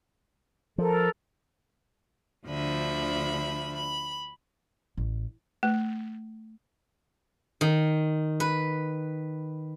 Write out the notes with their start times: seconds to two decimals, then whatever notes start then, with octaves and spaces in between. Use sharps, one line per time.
0.78 F3 A4 A#4
2.46 D2 D3 F3 E5 B5
3.75 B5
4.97 A1
5.63 A3
7.61 D#3
8.40 B4